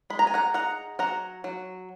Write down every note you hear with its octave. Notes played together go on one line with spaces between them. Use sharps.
G#3 B5
A#5
G#5
F#5 A#5
D#4 F#5 A#5
F#3 F#5 A#5
F#3